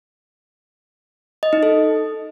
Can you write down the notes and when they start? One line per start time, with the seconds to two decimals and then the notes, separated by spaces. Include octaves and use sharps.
1.43 D#5
1.53 D#4
1.63 A4